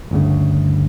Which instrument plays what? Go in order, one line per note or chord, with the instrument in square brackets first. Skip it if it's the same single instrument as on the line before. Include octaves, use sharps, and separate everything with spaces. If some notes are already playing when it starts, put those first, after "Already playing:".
[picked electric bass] G1 D2 C#3